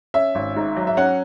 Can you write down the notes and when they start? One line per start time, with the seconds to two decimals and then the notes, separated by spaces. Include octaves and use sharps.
0.14 C#4 E5
0.35 G#1
0.56 G#2
0.77 F#3
0.87 E5
0.97 C#4 F#5